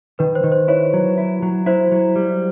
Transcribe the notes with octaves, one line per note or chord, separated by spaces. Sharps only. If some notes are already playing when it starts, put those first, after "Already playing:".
D#3 B4
C5
D#3
C5
E4 C#5
F#3
E4
F#3
E4 C5
F#3
G3